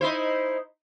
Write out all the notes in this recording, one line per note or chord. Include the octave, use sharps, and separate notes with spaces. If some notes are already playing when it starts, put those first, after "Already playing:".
D#4 E4 C5